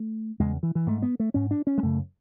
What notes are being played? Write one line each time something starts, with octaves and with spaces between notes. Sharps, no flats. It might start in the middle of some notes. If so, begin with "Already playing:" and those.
Already playing: A3
E2 C#3 G#3
E3
E3
G#2 A3
B3
A3
G#2 C#4
D4
C#4
G#3
F#2 C#3 A3